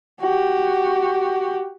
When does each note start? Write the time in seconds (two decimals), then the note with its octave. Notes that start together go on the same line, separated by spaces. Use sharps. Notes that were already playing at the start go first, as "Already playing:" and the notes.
0.20 F#4 G4